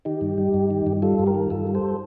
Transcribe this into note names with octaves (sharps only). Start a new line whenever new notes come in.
D#3 D#4 G4
G2
G3
G2
D#3
G2
G3 F4 A4
G2
G4 A#4
D#3
G2 F4 A4
G3
A4 C5